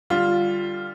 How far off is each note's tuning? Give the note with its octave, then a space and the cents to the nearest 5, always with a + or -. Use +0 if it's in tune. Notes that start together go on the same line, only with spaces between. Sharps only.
D3 +10 G3 +0 F4 +0